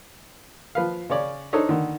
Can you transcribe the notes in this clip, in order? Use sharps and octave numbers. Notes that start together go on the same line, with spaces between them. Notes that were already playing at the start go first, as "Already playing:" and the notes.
F3 B4 F5
C#3 C#4 C#5 D5
D4 D#4 A4 C5 C#5 D#5
D3 D#3